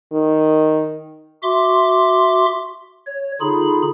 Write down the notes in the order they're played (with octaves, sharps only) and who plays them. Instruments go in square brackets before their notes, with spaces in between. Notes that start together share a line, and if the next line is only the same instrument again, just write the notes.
[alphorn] D#3
[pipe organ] F#4 E5 C6 D6
C#5
D3 D#4 F4 G#4 B5